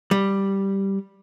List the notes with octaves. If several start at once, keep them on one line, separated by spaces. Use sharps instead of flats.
G3